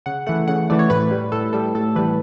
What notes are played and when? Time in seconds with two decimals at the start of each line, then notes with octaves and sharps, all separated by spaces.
0.06 C#3 F#5
0.27 E3 A3 F#5
0.48 C#3 F#5
0.70 E3 A3 D5
0.79 C#5
0.90 A2 B4
1.11 G3
1.32 A2 A4
1.53 G3 A4
1.75 A2 A4
1.95 E3 G3 B4